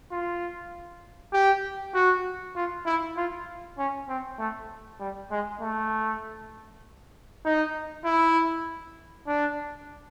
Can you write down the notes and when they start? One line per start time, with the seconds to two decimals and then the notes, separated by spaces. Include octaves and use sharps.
0.11 F4
1.33 G4
1.94 F#4
2.56 F4
2.86 E4
3.17 F4
3.78 C#4
4.09 C4
4.39 A3
5.00 G3
5.31 G#3
5.61 A3
7.45 D#4
8.05 E4
9.27 D4